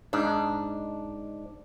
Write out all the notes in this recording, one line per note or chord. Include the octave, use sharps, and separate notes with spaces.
G#2 D4 D#4